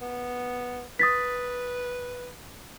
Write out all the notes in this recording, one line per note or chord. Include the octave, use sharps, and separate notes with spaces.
B3
B4 D#6 A6 B6